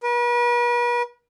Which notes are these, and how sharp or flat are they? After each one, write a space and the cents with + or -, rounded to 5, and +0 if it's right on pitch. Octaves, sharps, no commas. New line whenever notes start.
B4 -40